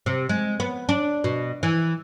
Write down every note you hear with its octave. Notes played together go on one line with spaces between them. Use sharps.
C3
G#3
B3
D4
B2
E3